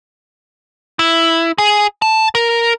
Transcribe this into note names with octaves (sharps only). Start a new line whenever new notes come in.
E4
G#4
A5
A#4